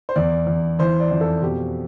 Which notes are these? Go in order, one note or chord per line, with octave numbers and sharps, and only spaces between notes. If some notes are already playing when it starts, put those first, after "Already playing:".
C5
E2 D5
E2
E3 C5
D5
F2
A4
B2 G4